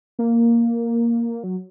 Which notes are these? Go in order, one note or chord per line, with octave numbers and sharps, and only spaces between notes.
A#3
F#3